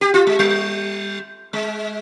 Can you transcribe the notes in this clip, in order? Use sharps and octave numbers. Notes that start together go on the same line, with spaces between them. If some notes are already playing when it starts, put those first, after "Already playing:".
G4
F4
G#3
G3
G#3